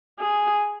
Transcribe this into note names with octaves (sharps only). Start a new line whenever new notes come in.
G#4